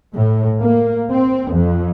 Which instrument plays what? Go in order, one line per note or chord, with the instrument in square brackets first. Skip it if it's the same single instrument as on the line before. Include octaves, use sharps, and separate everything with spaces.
[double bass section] A2
A#3
C4
F2